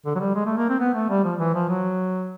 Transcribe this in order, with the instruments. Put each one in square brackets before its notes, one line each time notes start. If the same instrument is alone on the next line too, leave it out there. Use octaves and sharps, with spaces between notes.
[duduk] D3
F#3
G3
G#3
A3
A#3
C4
B3
A3
G3
F3
E3
F3
F#3